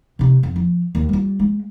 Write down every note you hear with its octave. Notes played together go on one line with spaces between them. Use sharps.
C3 D#4
F2
F3
D#2
G3 F4
G#3